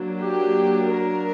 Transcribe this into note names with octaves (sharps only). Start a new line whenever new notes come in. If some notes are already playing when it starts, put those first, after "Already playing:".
Already playing: F#3 A#3 D4
G4
A#4